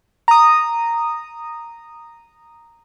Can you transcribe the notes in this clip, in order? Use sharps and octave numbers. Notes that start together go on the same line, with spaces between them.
A#5 D#6